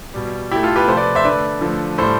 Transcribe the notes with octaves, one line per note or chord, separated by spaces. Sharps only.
B2 G3
B2 A3 E4 G4
F4 A4
G4 B4
C3 F3 A3 A4 C5
B4 D5
C5 E5
D3 A3 B4 D5
D3 F3 A3
A2 G3 A4 C5